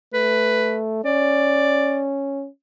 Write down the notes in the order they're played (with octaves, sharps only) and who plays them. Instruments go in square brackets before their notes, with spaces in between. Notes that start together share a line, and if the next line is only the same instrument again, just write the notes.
[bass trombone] A3 [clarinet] B4
[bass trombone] C#4 [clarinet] D5